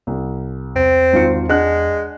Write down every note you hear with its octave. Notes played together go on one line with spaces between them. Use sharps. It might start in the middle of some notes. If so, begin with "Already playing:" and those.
C2
E2 C4
G#1 F4 C#7
G#3 D4 F#5 F#6